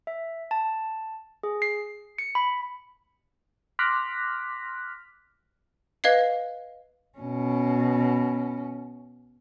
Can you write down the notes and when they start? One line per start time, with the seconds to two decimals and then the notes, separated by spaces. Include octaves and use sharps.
0.07 E5
0.51 A5
1.43 G#4
1.62 C7
2.18 C#7
2.35 B5
3.79 C6 D6 F6 F#6 A#6 B6
6.04 B4 D#5 F5 G#6 C7
7.18 B2 C#4